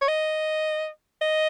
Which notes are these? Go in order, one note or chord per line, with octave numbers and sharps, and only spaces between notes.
C#5
D#5
D#5